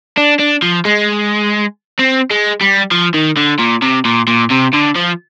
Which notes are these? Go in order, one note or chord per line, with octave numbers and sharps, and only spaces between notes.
D4
D4
F3
G#3
C4
G#3
G3
F3
D#3
D3
A#2
C3
A#2
A#2
C3
D3
F3